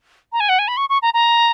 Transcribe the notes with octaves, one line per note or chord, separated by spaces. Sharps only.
A#5
G#5
F#5
G#5
B5
C#6
C#6
A#5
A#5